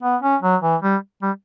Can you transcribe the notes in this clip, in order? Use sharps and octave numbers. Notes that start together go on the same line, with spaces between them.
B3
C#4
F#3
E3
G3
G3